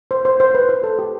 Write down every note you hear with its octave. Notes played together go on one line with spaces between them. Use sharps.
C5
C5
C5
B4
C5
A4
G4